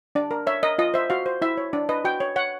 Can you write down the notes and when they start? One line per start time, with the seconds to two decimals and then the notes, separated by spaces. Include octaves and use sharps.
0.15 D4 D5
0.31 A#4
0.47 C#5 E5
0.63 A#4 D#5
0.78 F4 D#5
0.94 C5 E5
1.10 F#4 F5
1.26 C5
1.42 E4 E5
1.57 C#5
1.73 D4 D5
1.89 B4 D#5
2.04 F#4 G5
2.20 C#5
2.36 C#5 F#5